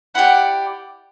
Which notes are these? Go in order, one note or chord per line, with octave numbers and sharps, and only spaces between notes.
E4 G4 D5 F#5